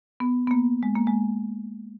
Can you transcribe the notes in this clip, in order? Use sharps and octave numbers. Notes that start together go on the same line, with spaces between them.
B3
B3
A#3
G#3
A#3
G#3